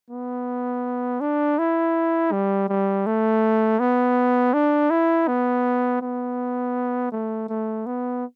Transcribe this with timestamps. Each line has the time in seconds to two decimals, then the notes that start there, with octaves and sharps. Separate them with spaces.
0.11 B3
1.21 D4
1.59 E4
2.32 G3
2.69 G3
3.06 A3
3.80 B3
4.54 D4
4.91 E4
5.28 B3
6.01 B3
7.12 A3
7.49 A3
7.86 B3